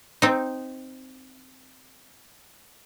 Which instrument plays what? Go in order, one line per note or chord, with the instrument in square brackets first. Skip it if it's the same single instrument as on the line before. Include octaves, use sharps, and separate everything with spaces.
[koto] C4 D#4